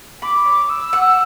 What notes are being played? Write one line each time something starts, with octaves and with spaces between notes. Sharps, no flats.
B5 D6
C#5
E6
F#5